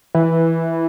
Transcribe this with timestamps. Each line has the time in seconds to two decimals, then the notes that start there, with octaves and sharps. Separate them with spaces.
0.15 E3